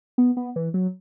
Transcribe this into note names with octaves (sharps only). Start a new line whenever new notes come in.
B3
B3
E3
F#3